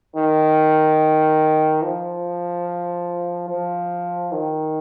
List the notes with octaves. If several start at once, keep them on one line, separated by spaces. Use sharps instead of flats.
D#3
F3
F3
D#3